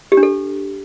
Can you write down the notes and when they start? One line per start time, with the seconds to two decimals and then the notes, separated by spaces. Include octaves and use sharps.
0.12 G4
0.17 D4
0.23 A4